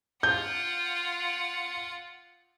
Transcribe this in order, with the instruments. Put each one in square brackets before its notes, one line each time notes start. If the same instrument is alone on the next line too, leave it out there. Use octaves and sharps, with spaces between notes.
[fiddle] F4 F#5 [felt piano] G6